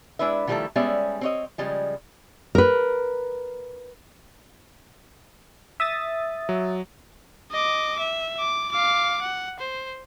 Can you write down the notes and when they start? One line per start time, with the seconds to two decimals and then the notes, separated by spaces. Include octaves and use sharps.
0.19 G#3 D4 E4 B4 E5
0.47 D#3 F3 G3 A3 E4 A4
0.76 G3 G#3 B3 C#4 D5 E5
1.21 C4 C#5 D#5
1.58 C#3 F3 G3 G#3
2.55 A#4 B4
5.80 E5 D#6 A6
6.49 F#3
7.52 D#5 D6
7.99 E5
8.39 D6
8.71 F5 D6
9.22 F#5
9.60 C5